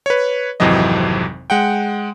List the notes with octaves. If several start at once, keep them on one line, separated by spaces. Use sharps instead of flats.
B4 C#5
G#1 F2 C3 E3 F#3 D#5
G#3 F#5 G5